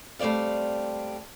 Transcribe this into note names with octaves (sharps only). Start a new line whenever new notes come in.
G3 A3 C4 D5 F5